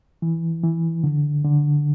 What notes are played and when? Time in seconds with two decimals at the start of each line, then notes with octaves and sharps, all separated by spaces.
0.22 E3
0.64 E3
1.04 D3
1.44 D3